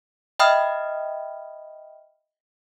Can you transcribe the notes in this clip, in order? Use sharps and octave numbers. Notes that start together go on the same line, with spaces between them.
D#5 E5 G5 B5 D#6 F6